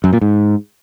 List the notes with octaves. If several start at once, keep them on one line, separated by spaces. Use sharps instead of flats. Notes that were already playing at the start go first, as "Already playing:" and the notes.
F#2
A#2
G#2